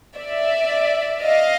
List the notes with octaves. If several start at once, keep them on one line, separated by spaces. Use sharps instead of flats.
D5 E5
D#5 F5